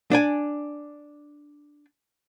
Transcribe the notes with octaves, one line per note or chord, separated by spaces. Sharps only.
D4 D5 G#5